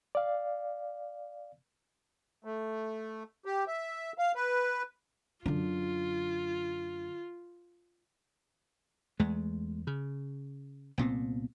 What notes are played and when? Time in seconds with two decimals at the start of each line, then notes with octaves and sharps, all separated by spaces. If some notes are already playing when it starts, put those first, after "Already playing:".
0.15 D5 F5
2.44 A3
3.45 G4
3.67 E5
4.18 F5
4.35 B4
5.46 F#2 D3 F4
9.19 E2 G#3 A3
9.87 C#3
10.98 C2 A#2 B3 C4